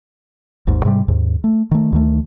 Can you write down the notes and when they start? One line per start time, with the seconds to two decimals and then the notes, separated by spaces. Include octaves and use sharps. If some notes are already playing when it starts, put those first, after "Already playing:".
0.67 G#1 D#2 G#2
0.85 G#2 C3 F3 G3
1.08 D#2 G#2
1.44 A3
1.71 D#3 A3
1.92 D2 D#3 A3